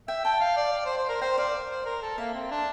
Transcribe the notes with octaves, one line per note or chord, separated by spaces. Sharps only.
E5 G5
G5 A5
F5
D5
D5
C5
C5
A#4
C5 G5
D5 F5
C5
A#4
A4
A#3 E5
C4
D4